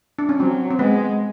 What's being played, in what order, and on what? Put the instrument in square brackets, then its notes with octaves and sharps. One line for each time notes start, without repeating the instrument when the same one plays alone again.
[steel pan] D4
C#4
[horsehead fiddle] F#3 [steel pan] C4
[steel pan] C4
[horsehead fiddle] G#3 [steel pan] B3